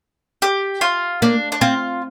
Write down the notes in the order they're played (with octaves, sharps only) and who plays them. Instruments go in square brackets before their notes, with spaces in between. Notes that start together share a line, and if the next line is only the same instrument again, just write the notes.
[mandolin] G4
F4
[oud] A#3 [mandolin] D4
[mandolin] D4
[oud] C4 [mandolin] F4